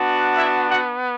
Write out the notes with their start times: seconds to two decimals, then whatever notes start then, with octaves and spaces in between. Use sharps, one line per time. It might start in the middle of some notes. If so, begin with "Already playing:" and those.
Already playing: B3 D4 F#4
0.37 E4 E5
0.70 F#4 F#5